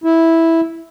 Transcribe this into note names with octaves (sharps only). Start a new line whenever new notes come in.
E4